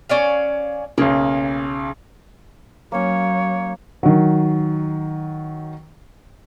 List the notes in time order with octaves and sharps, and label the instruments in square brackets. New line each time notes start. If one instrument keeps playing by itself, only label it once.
[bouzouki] C#4 D5 F5
[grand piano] B1 C#3 [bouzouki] A#3
[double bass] F#3 [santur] A#3 C#4 [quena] C#5
[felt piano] D#3 F#3